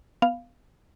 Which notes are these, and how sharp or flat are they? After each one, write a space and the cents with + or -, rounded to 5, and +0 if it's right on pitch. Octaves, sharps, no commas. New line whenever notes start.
B3 +0 F5 +0